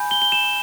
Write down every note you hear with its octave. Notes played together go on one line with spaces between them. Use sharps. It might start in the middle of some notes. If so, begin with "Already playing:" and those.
Already playing: G#5 B5 G6
G7
G7
E7